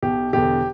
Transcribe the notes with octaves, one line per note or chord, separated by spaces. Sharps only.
B1 B2 G4
E1 E2 D3 G4